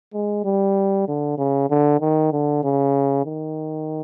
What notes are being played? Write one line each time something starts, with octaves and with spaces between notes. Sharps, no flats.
G#3
G3
D3
C#3
D3
D#3
D3
C#3
D#3